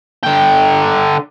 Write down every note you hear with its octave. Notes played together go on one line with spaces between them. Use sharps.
D3 G5